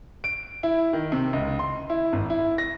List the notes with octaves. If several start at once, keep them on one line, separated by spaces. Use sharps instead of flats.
D7
E4
D#3
C3
C#2
C6
E4
G#1
E4
A#6